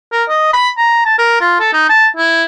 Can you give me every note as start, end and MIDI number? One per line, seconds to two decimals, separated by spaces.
0.12 0.24 70
0.29 0.50 75
0.53 0.69 83
0.78 1.02 82
1.05 1.18 81
1.19 1.40 70
1.41 1.58 65
1.60 1.69 69
1.73 1.86 63
1.89 2.07 81
2.17 2.44 64